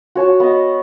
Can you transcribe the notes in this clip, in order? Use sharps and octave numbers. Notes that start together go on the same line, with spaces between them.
F#4 C#5 A5 C#6
B3 D#5